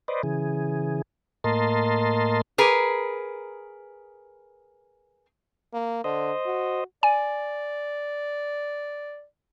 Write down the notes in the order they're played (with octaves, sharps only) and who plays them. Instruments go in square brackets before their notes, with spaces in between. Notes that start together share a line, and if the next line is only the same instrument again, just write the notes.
[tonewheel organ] B4 C5 D5 D#5
C#3 E3 G#4
A2 A#3 A#4 D#5 A5 C6
[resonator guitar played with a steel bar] G#4 A#4 B4
[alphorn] A#3
[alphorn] D3 [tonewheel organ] C5 D#5
[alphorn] F#4
[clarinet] D5 [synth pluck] G#5